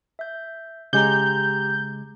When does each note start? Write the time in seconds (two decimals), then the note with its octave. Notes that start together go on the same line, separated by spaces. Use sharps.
0.19 E5 G6
0.93 C#3 G#3 G4 A#5 G6